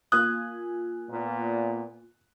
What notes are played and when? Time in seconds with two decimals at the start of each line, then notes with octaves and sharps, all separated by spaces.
0.12 A#3 F4 G#5 D#6 F#6
1.10 A#2 B3